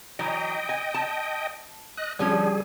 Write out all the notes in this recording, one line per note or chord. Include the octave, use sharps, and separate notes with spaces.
E3 F#3 D#5 G5
G#5
A5
D#5 F#6
D3 F3 G3 C#4 G#4